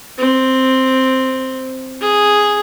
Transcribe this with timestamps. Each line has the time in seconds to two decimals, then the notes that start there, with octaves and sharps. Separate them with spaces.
0.18 C4
2.01 G#4